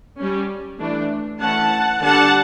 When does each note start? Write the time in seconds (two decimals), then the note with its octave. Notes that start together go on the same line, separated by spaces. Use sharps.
0.17 G3 C#4
0.79 E3 A3 D4
1.41 E3 A3 C#4 F#5 A5
2.02 D3 G3 D4 F#5 A5